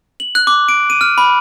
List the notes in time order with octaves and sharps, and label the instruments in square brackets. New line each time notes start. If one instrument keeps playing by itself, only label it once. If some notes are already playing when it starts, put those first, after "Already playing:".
[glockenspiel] F#7
F#6
D6
D7
D#7
F6
B5